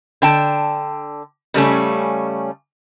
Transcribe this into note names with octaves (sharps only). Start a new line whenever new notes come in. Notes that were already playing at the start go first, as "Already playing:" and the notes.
D3 G5 A5
C#3 G3 A3 C#4